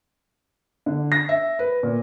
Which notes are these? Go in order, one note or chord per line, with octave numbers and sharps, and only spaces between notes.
D3
A#6
E5
B4
A#2